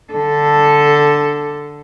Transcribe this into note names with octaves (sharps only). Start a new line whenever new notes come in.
D3 A4